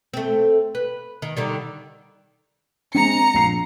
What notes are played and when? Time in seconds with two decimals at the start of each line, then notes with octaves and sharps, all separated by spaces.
0.13 A3 C4
0.75 B4
1.22 D#3
1.37 D3 D#3 G3
2.95 G#3 C4 A#5 C#7
3.34 A#1 C7